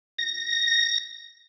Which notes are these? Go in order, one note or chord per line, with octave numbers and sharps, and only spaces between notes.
A#6